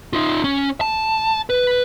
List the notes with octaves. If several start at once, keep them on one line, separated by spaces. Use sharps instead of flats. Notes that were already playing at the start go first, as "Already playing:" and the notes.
D#4 F4
C#4
A5
B4